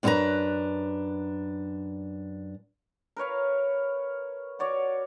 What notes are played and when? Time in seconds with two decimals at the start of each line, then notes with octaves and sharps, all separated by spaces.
0.03 F#2 C4 D4 F#4 B4 A#5
3.16 A#4 B4 C#5 F5
4.59 F#4 C#5 D5 F#5